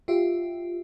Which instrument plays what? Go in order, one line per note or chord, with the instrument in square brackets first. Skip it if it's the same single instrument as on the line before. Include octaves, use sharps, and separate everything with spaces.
[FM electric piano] F4 G4 E5